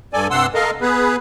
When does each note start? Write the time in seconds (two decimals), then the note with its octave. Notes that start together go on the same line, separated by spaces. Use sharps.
0.13 G2 A4 D5 G#5
0.30 G2 C3 F#5 C6 E6
0.54 A4 A#4 D#5 F5
0.81 B3 G#4 B4